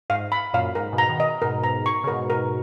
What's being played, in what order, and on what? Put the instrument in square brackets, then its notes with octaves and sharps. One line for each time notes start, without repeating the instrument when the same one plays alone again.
[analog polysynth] G#2 [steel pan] F5
[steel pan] B5
[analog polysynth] F#2 A#2 [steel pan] F5
[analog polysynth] G#2 [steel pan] A#4
[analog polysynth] G#2 B2
[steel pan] A#5
[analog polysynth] B2 D#3
[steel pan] D#5
[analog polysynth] G#2 B2 [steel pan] A#4
[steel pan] A#5
C#6
[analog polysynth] C#3
[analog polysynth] G#2 B2 [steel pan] A#4
[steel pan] A#4